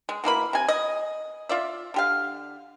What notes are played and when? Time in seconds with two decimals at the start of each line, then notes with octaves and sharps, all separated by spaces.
0.09 G#3
0.24 B2 E3 A#3 B5
0.53 C3 G#5
0.68 D#5
1.49 F4 D5 E5
1.94 D3 G4 F5